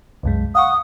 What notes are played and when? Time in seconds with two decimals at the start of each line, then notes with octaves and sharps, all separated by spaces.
0.23 C2 F#2 G#3
0.55 F5 F#5 C#6 D#6